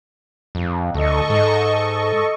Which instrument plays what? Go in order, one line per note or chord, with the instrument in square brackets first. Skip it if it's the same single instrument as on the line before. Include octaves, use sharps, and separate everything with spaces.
[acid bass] F2
[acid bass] D2 [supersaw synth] A4 D#5 C#6
[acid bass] G#2